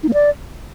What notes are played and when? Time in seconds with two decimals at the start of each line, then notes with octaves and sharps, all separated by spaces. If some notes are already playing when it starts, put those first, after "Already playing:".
0.03 D#4
0.08 A#3
0.14 D5